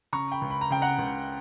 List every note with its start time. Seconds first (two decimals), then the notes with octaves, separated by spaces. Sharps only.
0.13 C#3 A#5 C#6
0.32 G5 B5
0.42 C#2
0.50 B5
0.61 A#5
0.70 C#3 G5
0.82 F#5 A#5
0.99 C#2